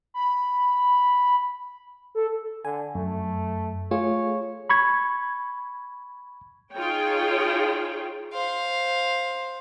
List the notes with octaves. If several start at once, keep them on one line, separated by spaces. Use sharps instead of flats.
B5
A4
D3 G#5
F#2 A3
A3 F4 G#4 C#5
B5 C#6 G#6
D#4 F4 G#4 C#5 G5
C5 F5